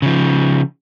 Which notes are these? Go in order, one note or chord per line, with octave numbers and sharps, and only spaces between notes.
C#3 F3